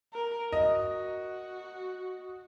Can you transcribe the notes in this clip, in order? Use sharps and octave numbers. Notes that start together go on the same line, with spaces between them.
A#4
F#4 D#5